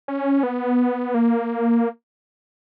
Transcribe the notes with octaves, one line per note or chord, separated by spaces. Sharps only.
C#4
B3
A#3